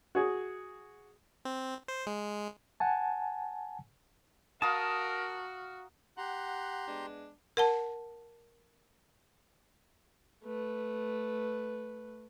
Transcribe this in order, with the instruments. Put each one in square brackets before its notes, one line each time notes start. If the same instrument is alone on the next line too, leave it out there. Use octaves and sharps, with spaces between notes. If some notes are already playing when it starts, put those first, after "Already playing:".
[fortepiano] F#4 G#4
[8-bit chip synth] C4
C5
G#3
[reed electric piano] F#5 G#5 A5
[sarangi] F#4 [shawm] A#4 [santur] F5 A#5 D#6 [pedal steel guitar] A5
[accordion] G4 A#5 C6 [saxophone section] F#5
[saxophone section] G#3 B3 D4
[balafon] A#4 F#5 A5
[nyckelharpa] A3 B4